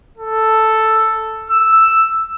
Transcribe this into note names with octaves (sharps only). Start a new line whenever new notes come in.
A4
E6